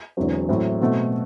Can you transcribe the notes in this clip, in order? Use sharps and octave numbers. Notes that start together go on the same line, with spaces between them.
E1 E2 D3 F#3 C4
A2 F#3 C4 E4
B2 A3 C4 F#4